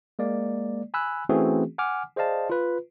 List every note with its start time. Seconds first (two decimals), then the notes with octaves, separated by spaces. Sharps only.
0.19 G#3 A#3 D5
0.94 G#5 B5 E6 F#6
1.29 E3 A3 C4 C#4 F#4 G#4
1.78 F#5 G#5 D6 F6
2.16 G#4 C5 D5 D#5 F5 A5
2.50 F4 B4